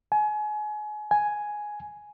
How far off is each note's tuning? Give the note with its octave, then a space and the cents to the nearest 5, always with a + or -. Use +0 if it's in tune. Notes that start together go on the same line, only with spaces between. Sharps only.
G#5 +30
G#5 +5